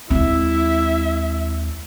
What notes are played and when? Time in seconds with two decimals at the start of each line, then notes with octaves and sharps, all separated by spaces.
0.10 D#2 G#3 C4 E4 E5